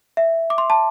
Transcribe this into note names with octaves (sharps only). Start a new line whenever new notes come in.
E5
D6
C6
A5